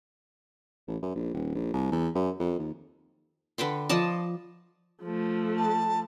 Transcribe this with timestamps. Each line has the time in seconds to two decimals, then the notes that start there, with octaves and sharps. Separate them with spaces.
0.88 A1
1.02 F#2
1.15 A#1
1.33 D#1
1.55 A#1
1.73 C2
1.92 E2
2.15 F#2
2.39 F2
2.58 D#2
3.58 D3 B4 G5 C6
3.89 F3 D5 D#5 A5
5.02 F3 A3
5.57 A5